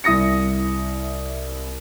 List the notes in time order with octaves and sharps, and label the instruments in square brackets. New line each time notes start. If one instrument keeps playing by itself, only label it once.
[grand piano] C2 E4 D#6 A#6 C#7